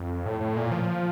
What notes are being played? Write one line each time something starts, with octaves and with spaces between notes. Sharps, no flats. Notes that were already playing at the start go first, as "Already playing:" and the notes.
Already playing: F2
A2
A2
A#2
F3